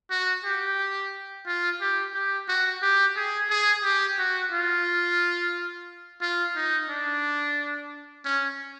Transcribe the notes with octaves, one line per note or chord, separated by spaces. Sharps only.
F#4
G4
F4
G4
G4
F#4
G4
G#4
G#4
G4
F#4
F4
F4
D#4
D4
C#4